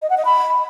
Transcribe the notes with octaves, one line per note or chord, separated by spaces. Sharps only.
D#5
F#5
D#5
B5